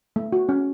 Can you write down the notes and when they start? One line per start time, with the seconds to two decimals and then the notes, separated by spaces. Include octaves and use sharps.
0.16 A3
0.33 F#4
0.49 C#4